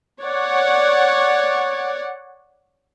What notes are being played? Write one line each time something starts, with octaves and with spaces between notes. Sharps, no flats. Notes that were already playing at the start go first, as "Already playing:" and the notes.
C#5 D5 F#5